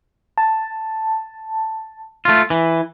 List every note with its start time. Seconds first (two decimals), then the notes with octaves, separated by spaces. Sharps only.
0.38 A5
2.25 A3 F4
2.50 E3